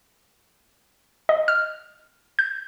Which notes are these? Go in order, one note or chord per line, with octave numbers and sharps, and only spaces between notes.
D#5
F6
G6